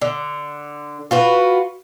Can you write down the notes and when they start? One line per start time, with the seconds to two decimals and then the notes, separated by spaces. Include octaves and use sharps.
0.02 D3
1.11 F4 F#4 B4